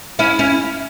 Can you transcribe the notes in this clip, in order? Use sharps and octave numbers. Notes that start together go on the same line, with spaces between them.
C#4 E4
C#4 E4